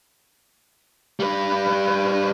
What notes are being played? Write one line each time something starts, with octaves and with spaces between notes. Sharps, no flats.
G3 B4